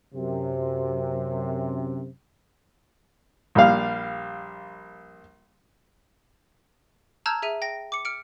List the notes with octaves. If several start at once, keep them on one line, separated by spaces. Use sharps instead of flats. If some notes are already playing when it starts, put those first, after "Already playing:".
F#2 C3
A#1 G3 F5
A5 A#5 E6 F6 G6 G#6
G#4 E5 D#7
G5 A#6
D6 C#7
F6 C#7 D7